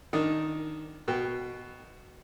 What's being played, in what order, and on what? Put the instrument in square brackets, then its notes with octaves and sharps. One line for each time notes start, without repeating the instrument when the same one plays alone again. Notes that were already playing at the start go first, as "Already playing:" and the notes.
[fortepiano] D#3 D4 D#4
B2 G5